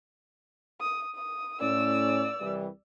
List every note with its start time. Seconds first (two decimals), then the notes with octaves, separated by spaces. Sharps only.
0.80 D#6
1.14 D#6
1.60 A2 C#4 D5 E6
2.41 C2 E3 G3